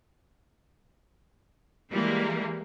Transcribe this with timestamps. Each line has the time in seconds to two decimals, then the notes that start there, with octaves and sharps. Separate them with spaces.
1.90 E3 G3 G#3 A#3